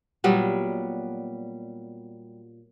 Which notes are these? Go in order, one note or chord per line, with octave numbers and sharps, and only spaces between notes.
A#2 F#3 G3 B3